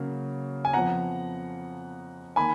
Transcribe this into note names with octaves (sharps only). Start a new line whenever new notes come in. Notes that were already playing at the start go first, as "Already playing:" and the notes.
Already playing: C#3 F#3 A#3
G#5
F2 F3 B3 F#5 A#5
D#3 A#3 G#5 B5